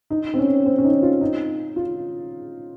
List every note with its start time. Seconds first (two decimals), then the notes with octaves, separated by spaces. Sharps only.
0.10 D#4
0.34 C4
0.38 C#4
0.66 C4
0.78 C#4
0.84 D#4
1.02 F4
1.21 D#4
1.76 F4